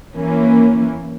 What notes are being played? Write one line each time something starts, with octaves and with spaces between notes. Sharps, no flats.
E3 A#3 C#4